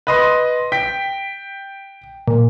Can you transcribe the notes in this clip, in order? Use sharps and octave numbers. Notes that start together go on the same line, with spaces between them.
B4 D#5 C6
G5 B6
A#2